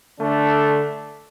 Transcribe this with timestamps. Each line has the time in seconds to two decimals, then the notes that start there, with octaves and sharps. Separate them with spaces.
0.19 D3 A3 D4 A4